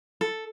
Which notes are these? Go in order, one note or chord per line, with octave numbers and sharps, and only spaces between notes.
A4